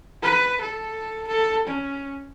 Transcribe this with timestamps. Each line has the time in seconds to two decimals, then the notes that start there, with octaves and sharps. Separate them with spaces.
0.23 B4
0.61 A4
1.27 A4
1.67 C#4